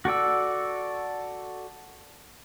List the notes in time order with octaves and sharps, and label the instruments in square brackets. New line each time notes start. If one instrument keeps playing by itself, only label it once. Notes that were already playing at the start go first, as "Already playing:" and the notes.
[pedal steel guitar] F#4 A4 D5 E6